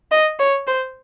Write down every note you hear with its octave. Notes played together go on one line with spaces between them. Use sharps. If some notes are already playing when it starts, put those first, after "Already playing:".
D#5
C#5
C5